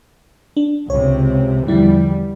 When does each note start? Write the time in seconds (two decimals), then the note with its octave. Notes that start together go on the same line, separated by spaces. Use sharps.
0.57 D4
0.90 C#2 C3 C#5
1.68 E2 D3 F3 G3 E4